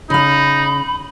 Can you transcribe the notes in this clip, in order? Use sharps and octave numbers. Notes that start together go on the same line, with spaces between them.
C#3 D#4 F5 B5